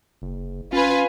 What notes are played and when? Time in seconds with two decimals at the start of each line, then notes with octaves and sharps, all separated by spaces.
0.22 F#1
0.73 C#4 F4 B4 G#5